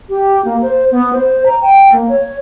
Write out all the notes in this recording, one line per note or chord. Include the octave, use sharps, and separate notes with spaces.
G4
A#3
C5
B3
C5
A#5
G5
A#3
C#5